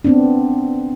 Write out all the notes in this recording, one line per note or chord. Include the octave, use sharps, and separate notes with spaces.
B3 C4 D4